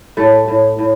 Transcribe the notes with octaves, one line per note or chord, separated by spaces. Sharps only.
A2 A3
A2
A2